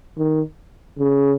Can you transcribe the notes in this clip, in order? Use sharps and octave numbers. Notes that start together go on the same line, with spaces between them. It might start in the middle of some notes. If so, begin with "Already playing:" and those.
D#3
C#3